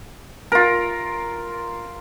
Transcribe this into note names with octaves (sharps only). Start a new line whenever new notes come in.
F4 A#4